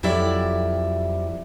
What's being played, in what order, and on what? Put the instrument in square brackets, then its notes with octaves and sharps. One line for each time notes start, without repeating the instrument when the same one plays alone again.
[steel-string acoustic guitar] F2 F#3 E4 G4 D5 E5